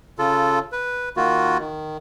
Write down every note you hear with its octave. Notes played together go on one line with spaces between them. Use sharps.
C#3 F4 A4
B4
D#3 A#3 F4 F#4
D#3